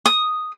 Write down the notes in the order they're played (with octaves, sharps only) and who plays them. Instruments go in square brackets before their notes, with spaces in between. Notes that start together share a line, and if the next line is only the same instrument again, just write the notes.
[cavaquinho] D#6